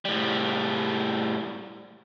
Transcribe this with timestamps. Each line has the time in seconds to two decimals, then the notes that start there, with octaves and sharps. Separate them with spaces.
0.05 A2 G3